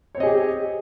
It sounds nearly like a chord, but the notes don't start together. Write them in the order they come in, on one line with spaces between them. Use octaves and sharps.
C#5 C4 D#5 G#4 G4